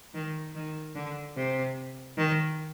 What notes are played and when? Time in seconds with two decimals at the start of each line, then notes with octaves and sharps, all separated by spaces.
0.14 D#3
0.56 D#3
0.95 D3
1.36 C3
2.17 D#3